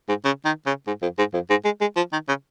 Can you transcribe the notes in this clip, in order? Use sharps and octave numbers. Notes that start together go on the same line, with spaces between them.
G#2
C#3
D#3
C#3
G#2
F2
G#2
F2
G#2
G#3
G#3
F3
D#3
C#3